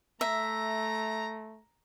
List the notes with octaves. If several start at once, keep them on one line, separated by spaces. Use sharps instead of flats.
A3 E5 A#5